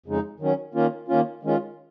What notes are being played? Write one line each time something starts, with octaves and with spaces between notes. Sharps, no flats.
F2 C#3 G#3 D#4
D#3 F#3 C#4
D#3 A#3 C#4 F4
D#3 A#3 C#4 F4
D#3 G#3 C#4 F4